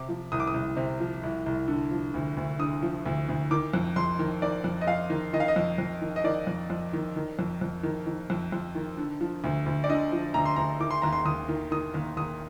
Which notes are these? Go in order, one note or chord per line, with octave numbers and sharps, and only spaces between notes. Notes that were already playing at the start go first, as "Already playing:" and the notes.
Already playing: C3 D6
F3
C2 D#6
D6
D#6
C2
C3
F3
C2
C2
D3
F3
D2
D2
D3 D#6
F3
D2
D2
D#3 D6
F2
F2 C6
D#3
D#3 D5
F2
D#5
F2 F5
D#3
D#3 D#5
F5
D#5
F2
F2
D#3
D#5
D#3 D5
F2
F2
D#3
D#3
F2
F2
D#3
D#3
F2
F2
D#3
D3
F3
D2
D2
D5
D3 D#5
F3
D2 A#5
C6
D2 A#5
D#3 D6
C6
D#2 A#5
C6
D#2 D#6
D#3
D#3 D#6
D#2
D#2 D#6